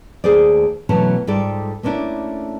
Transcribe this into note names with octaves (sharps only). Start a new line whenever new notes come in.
D#2 A3 G#4 C5 D5
B2 E3 F#3 A3 C#4 A5
G#2 G3 F4 A4 D5
A3 A#3 C#4 D4 E4